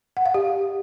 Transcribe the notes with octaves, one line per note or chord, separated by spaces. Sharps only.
F#5
F5
G4